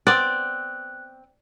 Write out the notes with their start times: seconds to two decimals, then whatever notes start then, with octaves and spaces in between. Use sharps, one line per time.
0.07 B3 C4 D5 F#5 F#6